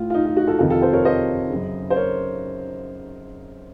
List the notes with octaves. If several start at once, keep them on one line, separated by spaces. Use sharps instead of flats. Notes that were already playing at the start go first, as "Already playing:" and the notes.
Already playing: A2 F4
F4
D#4
F4
D#4 F#4
F4 A4
F2 C3 D#3 F4 A4
F4 A4
A4 C5
A#4 C#5
C5 D#5
C#3
F#2
C5
A#4 C#5